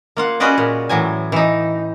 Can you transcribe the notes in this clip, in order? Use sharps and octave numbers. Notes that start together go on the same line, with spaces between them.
A#3 F4 F#5
C#4 F#4 G#4 B4 D5 D#5
A#2
A2 E3 F#3 G#5
E3 D#4